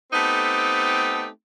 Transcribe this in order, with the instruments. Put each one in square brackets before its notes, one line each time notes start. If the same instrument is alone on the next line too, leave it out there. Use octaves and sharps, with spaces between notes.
[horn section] A3 B3 C4 D#4 G4 A4